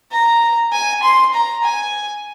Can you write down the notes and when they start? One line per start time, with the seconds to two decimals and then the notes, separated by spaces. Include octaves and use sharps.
0.12 A#5
0.72 G#5
1.03 C6
1.34 A#5
1.64 G#5